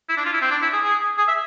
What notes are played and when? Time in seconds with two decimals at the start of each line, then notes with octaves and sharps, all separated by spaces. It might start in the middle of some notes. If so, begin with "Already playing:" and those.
0.09 E4
0.17 D4
0.25 F4
0.33 E4
0.41 C4
0.51 D4
0.62 E4
0.73 G#4
0.83 G#4
1.18 G#4
1.28 E5